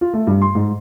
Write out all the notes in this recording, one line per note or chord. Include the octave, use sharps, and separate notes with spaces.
F4
A3
G2
C6
G#2